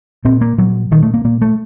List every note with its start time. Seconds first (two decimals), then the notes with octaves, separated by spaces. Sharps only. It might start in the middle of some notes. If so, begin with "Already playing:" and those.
0.25 A#2 C4
0.41 A#3
0.58 A#2 F#3
0.91 A#2 D#3
1.03 A3
1.14 A#3
1.24 A#2 A#3
1.41 A3